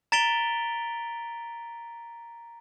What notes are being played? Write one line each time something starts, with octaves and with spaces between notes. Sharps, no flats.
A#5 A6 B6 D7 F7 G7